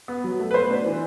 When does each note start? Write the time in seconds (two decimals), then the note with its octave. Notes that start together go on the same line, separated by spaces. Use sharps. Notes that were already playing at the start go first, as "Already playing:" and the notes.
0.08 B3
0.24 F#3
0.40 A3
0.51 B4
0.54 B2 C5
0.70 D4
0.86 E3